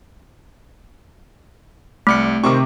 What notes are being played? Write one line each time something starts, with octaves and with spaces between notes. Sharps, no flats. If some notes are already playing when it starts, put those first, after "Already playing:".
C2 A3 F6 C#7
C3 D#3 C5 C#6 D6